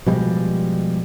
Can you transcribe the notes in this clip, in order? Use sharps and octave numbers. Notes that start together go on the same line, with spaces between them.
B2 F3 G3 G#3